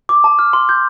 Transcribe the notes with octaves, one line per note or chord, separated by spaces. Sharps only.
D6
A5
F6
C6
G6